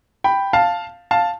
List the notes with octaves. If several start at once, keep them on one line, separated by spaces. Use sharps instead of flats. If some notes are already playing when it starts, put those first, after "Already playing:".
G5 B5
F5 A5
F5 A5